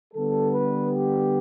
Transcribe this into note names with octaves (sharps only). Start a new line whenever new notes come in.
D3 G3 B3 A4
B4
G4